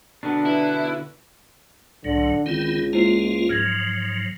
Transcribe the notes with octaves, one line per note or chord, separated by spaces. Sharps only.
B2 D3 B3 D4
E4 B4
C2 A2 D3 F#3
C#2 D#3 C4 E4
G#3 A#3 E4 F4 C5 C7
G#2 F3 F#3 F6 G#6 A#6